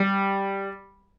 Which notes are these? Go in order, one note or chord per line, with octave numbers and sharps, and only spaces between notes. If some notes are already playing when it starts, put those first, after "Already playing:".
Already playing: G3